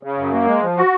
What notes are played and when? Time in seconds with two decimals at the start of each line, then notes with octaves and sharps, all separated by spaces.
0.03 C#3
0.18 F#2
0.33 A#3
0.47 G#3
0.62 F3
0.77 F#4